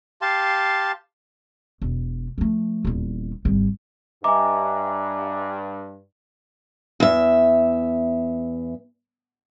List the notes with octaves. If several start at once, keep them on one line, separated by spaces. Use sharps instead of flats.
G4 F5 A5 C6
E1
F3 A3
D#1 E2
G#1 G3
G2 D#5 E5 G#5 A#5 D6
E2 E5